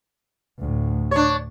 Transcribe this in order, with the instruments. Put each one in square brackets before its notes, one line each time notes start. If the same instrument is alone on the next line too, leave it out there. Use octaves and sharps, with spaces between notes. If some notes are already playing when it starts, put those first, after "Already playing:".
[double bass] D2 A2
[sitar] D4 C#5